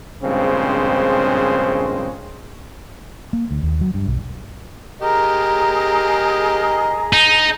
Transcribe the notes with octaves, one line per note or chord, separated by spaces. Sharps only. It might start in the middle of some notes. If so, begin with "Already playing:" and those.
A#1 G2 C#3 G#3 C4 C5
A#3
D2
D#2
F#3
G2
B1
G4 G#4 A#4 D#5 A#5
D#4